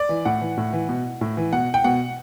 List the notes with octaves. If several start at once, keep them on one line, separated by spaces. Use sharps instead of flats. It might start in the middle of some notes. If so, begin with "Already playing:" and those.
Already playing: D5
E3
A2 F#5
E3
A2
E3
B2
A2
E3
B2 F#5
G5
B2 F#5